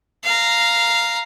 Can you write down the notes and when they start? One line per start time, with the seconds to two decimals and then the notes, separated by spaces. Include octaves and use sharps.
0.24 F5 A#5